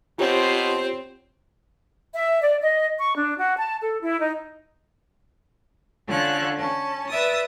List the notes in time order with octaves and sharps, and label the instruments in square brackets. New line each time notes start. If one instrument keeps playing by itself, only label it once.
[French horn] B2 [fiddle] C4 C5 [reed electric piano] F4 G4 C#5
[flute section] E5
D5
D#5
C#6
D4
F#4
A5
A4
E4
D#4
[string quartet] D3 C#4 F4 A4 C#5 F#6
C#4 A5
B4 D5 E5 D#6 A6